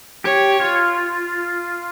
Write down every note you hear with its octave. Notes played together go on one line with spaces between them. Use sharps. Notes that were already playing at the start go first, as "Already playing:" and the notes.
G4 C#5
F4